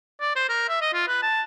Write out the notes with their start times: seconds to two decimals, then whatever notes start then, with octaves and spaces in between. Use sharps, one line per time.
0.21 D5
0.36 C5
0.49 A#4
0.69 E5
0.81 D#5
0.93 F4
1.08 B4
1.23 A5